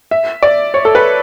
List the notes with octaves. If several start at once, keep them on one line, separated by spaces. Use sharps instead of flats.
E5
D5
C#5
A4
B4